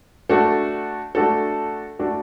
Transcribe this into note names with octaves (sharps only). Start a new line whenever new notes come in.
A3 D4 F#4 A4
A3 D4 F#4 A4
A3 D4 F#4 A4